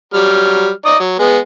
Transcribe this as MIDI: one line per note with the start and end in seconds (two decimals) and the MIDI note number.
0.14 0.70 54
0.14 0.70 55
0.14 0.70 89
0.86 0.97 63
0.86 0.97 74
0.86 0.97 87
1.00 1.16 54
1.20 1.38 56
1.20 1.38 59